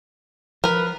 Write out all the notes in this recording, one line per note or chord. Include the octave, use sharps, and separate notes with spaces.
F3 A#4 B4